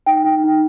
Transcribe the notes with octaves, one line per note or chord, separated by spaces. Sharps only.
D#4 G5
D#4
D#4